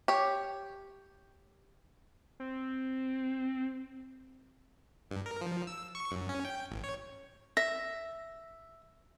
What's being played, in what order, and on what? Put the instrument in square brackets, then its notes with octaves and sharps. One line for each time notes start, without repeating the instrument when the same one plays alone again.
[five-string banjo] G4 C#5
[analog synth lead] C4
[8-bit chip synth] G2
A#4
F3
E6
C#6
F#2
C#4
G5
A1
C#5
[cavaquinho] E5 [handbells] A#6